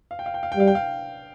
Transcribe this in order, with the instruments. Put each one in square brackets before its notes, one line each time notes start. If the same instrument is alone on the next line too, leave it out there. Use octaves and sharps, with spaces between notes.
[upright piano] F5
G5
F5
G5
F5
G5
[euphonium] G3 [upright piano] F5
[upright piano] G5
F5